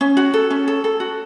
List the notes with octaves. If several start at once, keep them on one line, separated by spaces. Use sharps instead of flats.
C#4
F#4
A4
C#4
A4
A4
F#4